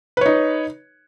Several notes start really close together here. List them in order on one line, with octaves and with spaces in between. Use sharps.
B4 C#5 D#4